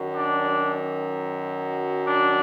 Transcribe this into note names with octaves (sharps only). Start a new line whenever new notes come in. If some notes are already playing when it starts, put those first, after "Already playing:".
Already playing: F#2 D#3 F#3
D4
D4